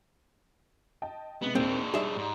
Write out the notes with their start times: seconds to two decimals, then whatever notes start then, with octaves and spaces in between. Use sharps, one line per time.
1.02 D#5 G5 A5
1.42 C3 G#3 B3
1.55 D#2 A#2 G#3 C4 D4
1.94 G3 D#4 G#4 D5 E5
2.16 G#2